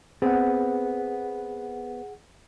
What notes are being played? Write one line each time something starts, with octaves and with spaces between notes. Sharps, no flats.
B3 C4 G#4 F#5